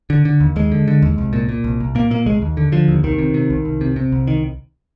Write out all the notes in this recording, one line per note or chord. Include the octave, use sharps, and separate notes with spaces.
D3
D3
D#2
D#2 G#3
D3
D3
D#2
C2
A#2
A#2
C2
C2
A#2 A#3
A#2 A#3
C2 G#3
D#2
D3
D3 F3
D#2
C2 D#3
C3
C3
C2
C2
C3
C3
C2
D#3